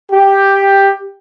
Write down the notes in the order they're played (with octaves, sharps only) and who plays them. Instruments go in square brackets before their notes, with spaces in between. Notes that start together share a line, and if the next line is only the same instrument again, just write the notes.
[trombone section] G4